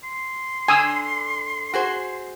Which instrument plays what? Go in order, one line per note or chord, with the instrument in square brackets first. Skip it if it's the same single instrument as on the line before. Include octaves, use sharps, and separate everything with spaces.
[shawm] C6
[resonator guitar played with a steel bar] D3 [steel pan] G#5 D#6 E6
[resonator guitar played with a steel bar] F#4 G#4 C5